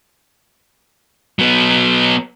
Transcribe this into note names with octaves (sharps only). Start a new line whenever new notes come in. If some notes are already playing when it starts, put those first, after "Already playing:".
F#3 B3